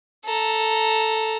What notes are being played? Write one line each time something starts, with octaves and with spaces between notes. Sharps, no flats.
A4 A#5